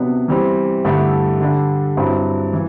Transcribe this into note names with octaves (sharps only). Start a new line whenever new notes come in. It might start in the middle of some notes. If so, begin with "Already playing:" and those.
Already playing: C3 F#3 B3 D4
E3 G3 C4
G2 D3 A3 E4 G4
D3 G3 D4
G2 F#3 C4 E4
E3